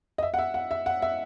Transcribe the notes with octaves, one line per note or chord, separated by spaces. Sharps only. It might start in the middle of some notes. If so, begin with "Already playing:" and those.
D#5
E5
F#5
E5
F#5
E5
F#5
E5